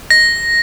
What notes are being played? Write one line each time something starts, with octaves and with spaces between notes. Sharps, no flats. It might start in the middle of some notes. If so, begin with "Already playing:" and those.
A#6